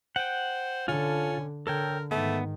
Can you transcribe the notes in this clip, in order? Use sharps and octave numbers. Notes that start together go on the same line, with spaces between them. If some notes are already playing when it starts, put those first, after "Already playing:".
C5 F#5 G5
D3 C#4 F4 A4
D3 A4 A#4 C#5 G5
G#2 D#3 A3 B3